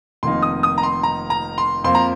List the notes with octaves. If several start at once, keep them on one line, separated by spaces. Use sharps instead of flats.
F1 F2 D#3 A#3 D#4 C6
D#6
D#6
A#5
C6
A#5
A#5
C6
F2 F3 A#3 C6
A#5